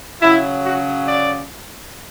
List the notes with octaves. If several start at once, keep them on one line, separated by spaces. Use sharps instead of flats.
C#3 F#3 E4
F#4
D5